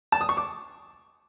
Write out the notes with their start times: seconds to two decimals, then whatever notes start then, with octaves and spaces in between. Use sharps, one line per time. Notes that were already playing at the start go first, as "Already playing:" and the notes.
0.12 A5
0.21 D#6
0.29 C#6
0.37 D6